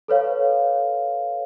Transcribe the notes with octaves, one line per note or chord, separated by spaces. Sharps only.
A4 B4 C#5 F5